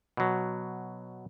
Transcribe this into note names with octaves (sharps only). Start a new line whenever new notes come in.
B2 F#3